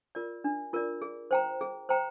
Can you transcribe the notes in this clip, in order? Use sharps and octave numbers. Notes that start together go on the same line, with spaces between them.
F4 A#4 D5
D4
F4 A#4 D5
G#4
C5 G5 A#5
G#4
C5 G5 A#5